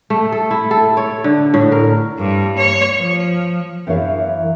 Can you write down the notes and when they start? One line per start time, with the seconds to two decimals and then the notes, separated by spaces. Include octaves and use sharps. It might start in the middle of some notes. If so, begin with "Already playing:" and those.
0.10 A3
0.33 A4
0.51 E4
0.71 A4
0.97 C#5
1.24 D3
1.54 A2
1.72 A#4
2.19 G2
2.57 C#5
2.97 F3
3.87 F#2 E3 E4 C#5 F5